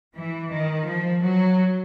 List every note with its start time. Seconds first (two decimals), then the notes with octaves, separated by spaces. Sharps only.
0.16 E3
0.52 D#3
0.87 F3
1.22 F#3